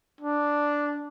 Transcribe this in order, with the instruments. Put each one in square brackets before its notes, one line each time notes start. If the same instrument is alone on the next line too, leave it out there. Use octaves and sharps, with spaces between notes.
[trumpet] D4